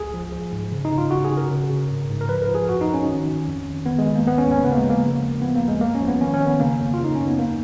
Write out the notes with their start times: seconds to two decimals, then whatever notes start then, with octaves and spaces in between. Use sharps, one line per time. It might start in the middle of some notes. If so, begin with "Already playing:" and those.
Already playing: C#2 G#4
0.14 F3
0.32 F3
0.52 G#2
0.72 C#3
0.85 D#4
0.92 C#3
0.98 F4
1.11 C#3 F#4
1.25 G#4
1.31 C#3
1.37 A#4
1.50 C#3
1.70 C#3
1.89 G#2
2.09 G#2
2.21 A#4
2.29 F3 B4
2.42 A#4
2.48 F3
2.55 G#4
2.68 F#2 F#4
2.81 D#4
2.87 F#2
2.94 C#4
3.07 D#3
3.27 D#3
3.47 F2
3.66 D#3
3.86 D#3 B3
3.99 G#3
4.06 D#3
4.16 A#3
4.24 D#2 B3
4.38 C#4
4.44 D#2
4.51 C#4
4.64 C#3 B3
4.72 A#3
4.77 G#3
4.83 F3
4.90 A#3
5.04 C#3
5.23 D#2
5.42 F3 B3
5.56 A#3
5.62 D#2
5.68 G#3
5.81 F2 A#3
5.95 C#4
6.02 F3
6.07 B3
6.20 D#3 C#4
6.34 C#4
6.40 D#3
6.47 B3
6.60 C#3 A#3
6.80 F2
6.94 F4
6.99 C#3
7.04 D#4
7.15 F#2 C#4
7.27 B3
7.38 D#2 A#3